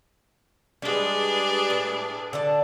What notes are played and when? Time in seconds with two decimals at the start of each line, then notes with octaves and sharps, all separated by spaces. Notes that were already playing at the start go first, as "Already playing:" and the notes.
0.82 G3 G#3 D4 G#4 B4
1.70 A2
2.33 D3 D5 A5